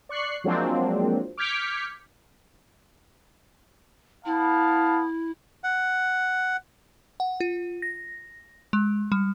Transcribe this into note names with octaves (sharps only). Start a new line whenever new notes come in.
D5 C#6 F#6 C7
F3 F#3 G#3 A#3 C4 D4
D6 F6 G6 G#6 B6 C#7
B3 E4 F5 A5
F#5
F#5
F4
A#6
G#3
G3